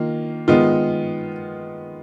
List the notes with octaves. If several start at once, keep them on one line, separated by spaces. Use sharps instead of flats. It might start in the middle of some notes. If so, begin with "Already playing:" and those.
Already playing: D#3 A#3 F4
D#3 G#3 B3 F4